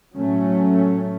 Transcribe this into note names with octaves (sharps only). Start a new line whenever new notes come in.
A2 F#3 A3 C#4